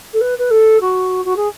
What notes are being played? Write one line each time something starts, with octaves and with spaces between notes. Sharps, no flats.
A4
B4
B4
A4
F#4
F#4
G#4